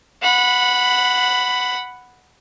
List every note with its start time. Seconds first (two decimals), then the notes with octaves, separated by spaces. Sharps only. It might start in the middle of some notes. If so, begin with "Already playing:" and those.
0.22 F#5 B5